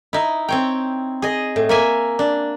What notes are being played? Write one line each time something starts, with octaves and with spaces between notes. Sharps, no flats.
D#4 E4
C4 C#5 G5
G#4 D#5
A2
A#3 E5 G#5
D4